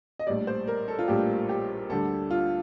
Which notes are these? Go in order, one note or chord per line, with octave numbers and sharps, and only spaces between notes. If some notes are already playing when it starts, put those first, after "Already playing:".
D#5
A#1 A2 G3 D5
C5
A#4
A4
F4
A#1 A2 G3 G4
G4
D2 D3 G3 D4 A4
F4